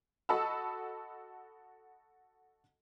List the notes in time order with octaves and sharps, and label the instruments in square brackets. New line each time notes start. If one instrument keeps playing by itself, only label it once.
[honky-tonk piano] F#4 A4 D#5 A5 B5 E6